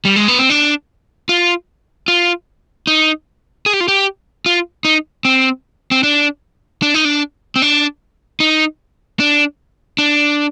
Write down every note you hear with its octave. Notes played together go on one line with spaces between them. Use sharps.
G3
G#3
B3
C4
D4
F4
F4
D#4
G#4
G4
F4
G4
F4
D#4
C4
C4
D4
D4
D#4
D4
C4
D4
D#4
D4
D4